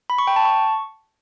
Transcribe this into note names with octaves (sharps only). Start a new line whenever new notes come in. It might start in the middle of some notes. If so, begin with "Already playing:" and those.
B5
C#6
G5
A5
C#6